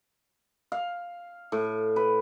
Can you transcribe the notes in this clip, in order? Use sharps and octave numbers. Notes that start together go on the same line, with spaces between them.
F5
A2
B4